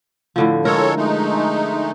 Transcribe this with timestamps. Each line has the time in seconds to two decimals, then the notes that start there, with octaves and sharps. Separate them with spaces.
0.36 A2 D3 F3
0.65 G#3 A4 A#4 C#5
0.97 G#3 A3 D#4